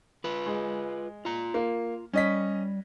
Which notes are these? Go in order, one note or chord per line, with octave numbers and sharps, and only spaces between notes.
F4 B4
G#3
F4 A#5
A#3
G3 C#4 D#5 B6